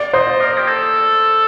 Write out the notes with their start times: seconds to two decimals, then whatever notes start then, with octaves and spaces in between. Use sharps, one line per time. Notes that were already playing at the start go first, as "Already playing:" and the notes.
Already playing: D5
0.13 C5 D#5
0.40 A#4
0.58 G4
0.68 A4